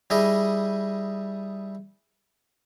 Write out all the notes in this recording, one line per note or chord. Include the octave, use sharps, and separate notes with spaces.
G3 E4 G#4 D#5